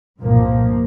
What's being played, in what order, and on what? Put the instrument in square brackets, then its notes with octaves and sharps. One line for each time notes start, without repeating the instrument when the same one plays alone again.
[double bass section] C2 G2 A#2 F3 A#3